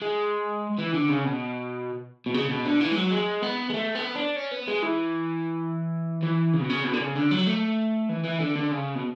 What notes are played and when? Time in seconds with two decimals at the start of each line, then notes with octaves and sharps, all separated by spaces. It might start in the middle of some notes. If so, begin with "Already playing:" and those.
0.02 G#3
0.79 E3
0.94 D3
1.10 C#3
1.25 B2
2.26 B2
2.34 C#3
2.50 B2
2.65 D3
2.81 E3
2.92 G#3
2.97 F#3
3.12 G#3
3.43 B3
3.70 G#3
3.74 A3
3.95 B3
4.15 D4
4.36 C#4
4.51 B3
4.68 G#3
4.82 E3
6.23 E3
6.53 C#3
6.61 B2
6.70 C#3
6.84 B2
6.93 D3
7.00 C#3
7.16 D3
7.31 F#3
7.47 A3
8.09 E3
8.24 E3
8.40 D3
8.56 D3
8.71 C#3
8.95 B2